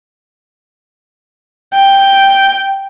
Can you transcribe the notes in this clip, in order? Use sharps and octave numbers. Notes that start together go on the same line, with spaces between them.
G5